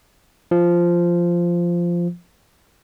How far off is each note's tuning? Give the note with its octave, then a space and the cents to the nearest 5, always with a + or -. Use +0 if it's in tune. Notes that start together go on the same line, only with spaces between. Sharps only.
F3 -10